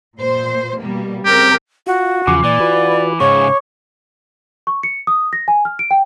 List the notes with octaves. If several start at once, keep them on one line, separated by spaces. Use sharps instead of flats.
A#2 C5
B2 G3 A#3
C#3 C4 G4 A#4
F4 F#4
E2 C#3 F3 C6 D6
A#2 E3 D5
F4 F#4 B4
G#2 C#3 G#4 C#5 C#6
C#6
C#7
D#6
A#6
G#5
F6
D7
G5